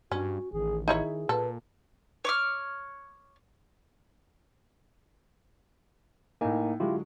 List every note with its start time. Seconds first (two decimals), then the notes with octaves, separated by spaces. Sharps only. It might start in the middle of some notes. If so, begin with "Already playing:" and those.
0.12 G2 C#4 F#4
0.53 A1 D#3 G#4
0.88 D#4 E4 G#4 C#5
1.29 A#2 A4 B4
2.25 C#5 D6 F6
6.41 A2 A#3 D#4 G#5
6.80 D3 F#3 G#3 E4 F4 G4